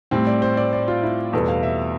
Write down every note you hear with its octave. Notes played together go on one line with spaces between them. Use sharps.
A2 G3 C4
D5
C5
D5
D5
F4
E4
E2 B2 G3 B3 A4
F5
E5